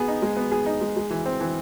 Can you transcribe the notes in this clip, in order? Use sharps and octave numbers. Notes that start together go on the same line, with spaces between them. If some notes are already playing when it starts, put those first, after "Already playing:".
Already playing: B3 G#4
D#4
G#3
B3
G#4
D#4
G#3
G#3
E3
C4
E3